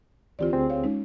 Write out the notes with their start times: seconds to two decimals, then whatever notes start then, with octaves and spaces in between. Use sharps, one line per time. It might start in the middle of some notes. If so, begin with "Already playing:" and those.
0.39 D2 E3 C4 F4 G4 D5
0.53 D2 C4 G#4
0.70 C#5 F5
0.84 G#3 C#4 D#4